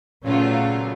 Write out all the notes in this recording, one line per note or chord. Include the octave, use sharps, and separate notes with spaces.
A#2 C#3 F#3 A3 B3 C#4 F4